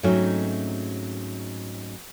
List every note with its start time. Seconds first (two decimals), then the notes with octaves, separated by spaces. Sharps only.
0.03 G#2 F#3 A3 C4 C#4 D#4